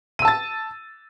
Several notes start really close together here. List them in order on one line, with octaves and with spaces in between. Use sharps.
D#7 E6 A5 A6